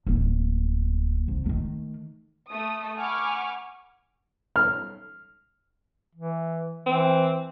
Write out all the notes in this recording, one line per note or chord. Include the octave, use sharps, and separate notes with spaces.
D1 A#3
C2
D#3 A3
A3 D#6
F#5 G#5 B5 C#6 D6 F6
F6
E3
E3 C4